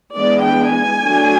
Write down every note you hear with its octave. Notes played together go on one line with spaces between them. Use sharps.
E3 G#3 B3 D4 D5
G5
G#5
F#3 A3 D4